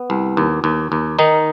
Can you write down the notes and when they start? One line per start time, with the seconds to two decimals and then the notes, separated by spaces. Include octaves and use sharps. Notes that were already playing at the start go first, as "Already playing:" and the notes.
Already playing: B3
0.10 C2
0.37 D#2
0.64 D#2
0.92 D#2
1.19 D#3 D#4